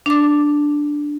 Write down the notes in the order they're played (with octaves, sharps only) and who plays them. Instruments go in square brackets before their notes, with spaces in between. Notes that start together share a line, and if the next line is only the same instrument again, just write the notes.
[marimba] D4 D6